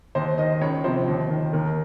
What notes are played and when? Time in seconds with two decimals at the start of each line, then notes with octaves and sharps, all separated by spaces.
0.15 D#2 C5
0.38 D#3 D#5
0.61 C#2 C#5
0.84 C3 F3 C5
1.07 D#2
1.30 D#3
1.53 D#2 A#4